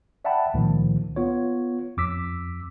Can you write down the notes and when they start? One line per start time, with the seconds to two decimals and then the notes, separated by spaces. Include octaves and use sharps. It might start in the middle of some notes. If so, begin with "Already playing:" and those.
0.25 D5 E5 F#5 G5 A5 B5
0.54 C#2 A#2 D#3 F3
1.16 B3 F4 C#5
1.97 F2 D6 E6 B6